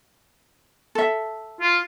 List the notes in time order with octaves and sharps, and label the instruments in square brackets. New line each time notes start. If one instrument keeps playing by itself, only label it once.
[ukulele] A4 E5
[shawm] F4